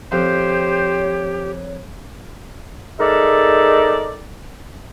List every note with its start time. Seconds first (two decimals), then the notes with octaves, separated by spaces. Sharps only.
0.12 F2 G4 C5 C#5
2.99 G#3 D#4 A4 A#4 D5 E5